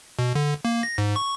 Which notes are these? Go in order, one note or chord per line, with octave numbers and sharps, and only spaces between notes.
B2
D3
A#3
A#6
G#2
C#6